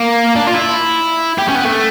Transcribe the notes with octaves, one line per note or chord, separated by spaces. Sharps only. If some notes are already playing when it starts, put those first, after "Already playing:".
Already playing: A#3
D4
F4
E4
G4
C#4
B3
A3